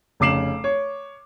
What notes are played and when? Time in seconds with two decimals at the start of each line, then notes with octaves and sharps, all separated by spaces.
0.20 F1 C#3 D6 C7 E7 F#7
0.64 C#5